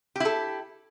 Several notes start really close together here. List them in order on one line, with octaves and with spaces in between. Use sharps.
G4 E4 A4